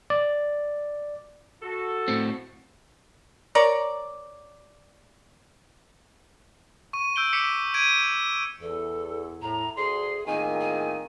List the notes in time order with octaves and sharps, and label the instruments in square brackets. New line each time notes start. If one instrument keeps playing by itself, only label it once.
[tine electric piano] D5
[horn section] F#4 A4
[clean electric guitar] A2 C4
[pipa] A#4 C#5 D5
[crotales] C#6 D#7
E6 G6 D7 G7
D6 B6 C#7
G#6 D7 D#7
[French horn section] E2 [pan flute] A4
[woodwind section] A2 [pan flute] A#5
[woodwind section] D2 C6 [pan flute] G#4
[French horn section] A2 F4 G#4 [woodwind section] D#3 A#3 C4 [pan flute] G#5
[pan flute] G#5